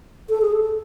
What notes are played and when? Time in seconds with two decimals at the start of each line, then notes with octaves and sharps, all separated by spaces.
0.29 A4
0.41 G#4
0.53 A4